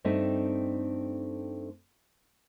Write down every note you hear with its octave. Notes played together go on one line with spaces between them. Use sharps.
G2 A3 C4 D#4 E5